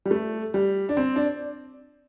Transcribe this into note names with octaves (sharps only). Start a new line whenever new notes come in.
G3
A3
G3
D4
C4
D4